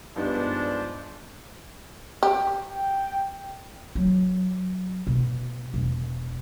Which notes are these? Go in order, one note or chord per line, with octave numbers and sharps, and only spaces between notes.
G2 F3 G#3 B3 D4 D#4
G4
G5
F#3
B2
E1